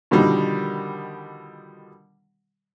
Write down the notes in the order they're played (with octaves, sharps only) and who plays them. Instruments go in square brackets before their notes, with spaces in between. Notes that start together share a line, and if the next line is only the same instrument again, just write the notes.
[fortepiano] B2 D3 D#3 F3 G3